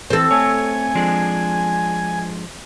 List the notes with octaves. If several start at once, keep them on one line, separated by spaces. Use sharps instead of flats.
E3 C4 A4
A3 C#5 G#5
F3 G#3 D4